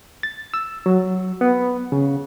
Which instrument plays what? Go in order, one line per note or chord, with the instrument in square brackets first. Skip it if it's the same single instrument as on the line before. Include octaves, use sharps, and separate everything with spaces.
[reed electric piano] A6
E6
F#3
B3
C#3